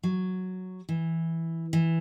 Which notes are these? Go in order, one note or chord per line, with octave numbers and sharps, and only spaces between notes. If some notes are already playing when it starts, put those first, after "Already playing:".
F#3
E3
E3